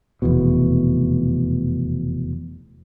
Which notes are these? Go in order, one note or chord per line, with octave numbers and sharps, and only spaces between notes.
F1 E2 B2